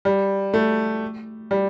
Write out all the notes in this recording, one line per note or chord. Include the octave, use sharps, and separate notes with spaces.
G3
A3
G3